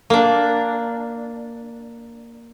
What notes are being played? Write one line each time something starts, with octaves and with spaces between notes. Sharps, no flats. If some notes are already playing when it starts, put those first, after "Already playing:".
A#3 D4